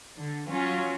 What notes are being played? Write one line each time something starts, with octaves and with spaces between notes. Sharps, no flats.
D3
F#3 C#4 F4